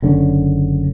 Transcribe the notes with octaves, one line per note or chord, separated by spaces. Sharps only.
F#1 D3 C#4